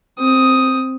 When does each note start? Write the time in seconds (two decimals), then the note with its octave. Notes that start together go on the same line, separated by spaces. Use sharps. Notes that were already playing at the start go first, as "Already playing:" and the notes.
0.19 C4 D#6